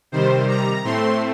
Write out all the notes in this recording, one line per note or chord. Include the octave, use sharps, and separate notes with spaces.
C3 D#3 G3 C5
A#5
A2 A3 C4 C6